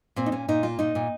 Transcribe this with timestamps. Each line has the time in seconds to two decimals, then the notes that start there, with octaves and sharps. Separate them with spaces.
0.16 A#2 C4
0.26 D#4
0.32 A#2 C#4
0.48 A#2 D#4
0.63 A#3 F4
0.79 A#2 D#4
0.95 A#2